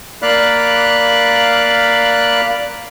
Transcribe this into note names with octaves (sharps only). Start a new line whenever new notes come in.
A#3 D5 F5 B5 F#6